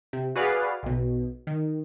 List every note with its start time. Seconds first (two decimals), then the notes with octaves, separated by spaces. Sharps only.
0.13 C3
0.36 F#4 G#4 B4 D5 F5 F#5
0.83 B1 B2
1.47 D#3